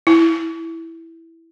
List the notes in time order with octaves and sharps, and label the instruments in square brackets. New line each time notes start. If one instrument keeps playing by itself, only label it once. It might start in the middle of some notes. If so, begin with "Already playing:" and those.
[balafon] E4